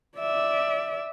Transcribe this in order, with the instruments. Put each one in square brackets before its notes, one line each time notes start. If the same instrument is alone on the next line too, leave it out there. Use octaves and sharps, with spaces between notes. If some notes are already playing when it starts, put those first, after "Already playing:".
[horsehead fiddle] D5 E5